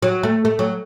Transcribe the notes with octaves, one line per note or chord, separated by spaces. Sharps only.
F#3
A3
A3
F#3